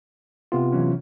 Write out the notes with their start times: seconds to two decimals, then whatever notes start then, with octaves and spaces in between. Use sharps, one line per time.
0.52 C3 B3 F4
0.72 E3 F#3 C#4